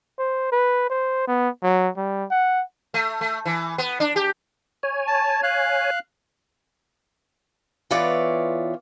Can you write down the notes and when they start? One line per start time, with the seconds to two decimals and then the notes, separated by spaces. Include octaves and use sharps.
0.19 C5
0.52 B4
0.90 C5
1.28 B3
1.63 F#3
1.97 G3
2.31 F#5
2.94 A3
3.21 A3
3.45 E3
3.78 B3
4.00 D4
4.16 G4
4.83 C#5 G#5
5.07 A5
5.43 F5 F#6
7.91 E3 B3 F4 C#5 D5 E5